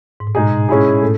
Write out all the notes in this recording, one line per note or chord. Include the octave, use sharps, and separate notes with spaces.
G#2
A2
B2 G#3 D#4 G#4
G#3 C#4 E4 G#4
A2
A3